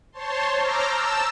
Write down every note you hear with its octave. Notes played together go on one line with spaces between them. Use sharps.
C5 C#5 A5 C6
A#5 D6 E6 F6 G6 A#6
A5 E6 E7